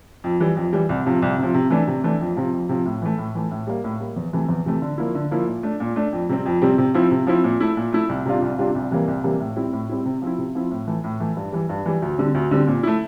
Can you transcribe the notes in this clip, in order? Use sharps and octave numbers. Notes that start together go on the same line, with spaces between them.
F2
E3 G3
F2
E3 G3
C2
C3 F3
C2
C3 F3
C3
E3 A3 D4
C3
E3 A3 D4
F2
C3 F3
F2
C3 F3
A2
E3 A3
A2
E3 A3
A2
G3 A#3
A2
G3 A#3
E2
C3 E3 A3
E2
C3 E3 A3
D3
F3 A#3 E4
D3
F3 A#3 E4
A#2
A3 D4
A#2
A3 D4
F2
C3 G3 C4
F2
C3 G3 C4
C3
F3 C4 E4
C3
F3 C4 E4
A#2
A3 E4
A#2
A3 E4
C2
C3 G3 D4 F4
C2
C3 G3 D4 F4
C2
C3 E3 G3 A#3
C2
C3 E3 G3 A#3
A2
G3 C4 E4
A2
G3 C4 E4
C3
F3 C4 E4
C3
F3 C4 E4
A2
E3 A3
A2
E3 A3
G2
E3 G3
G2
E3 G3
D2
D3 G3 C4
D2
D3 G3 C4
A#2
A3 E4